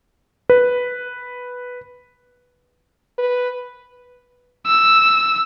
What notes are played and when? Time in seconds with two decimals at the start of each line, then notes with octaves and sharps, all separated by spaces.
0.50 B4
3.18 B4
4.67 E6